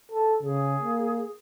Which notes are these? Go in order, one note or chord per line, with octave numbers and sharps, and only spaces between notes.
A4
C#3 G#4
A#3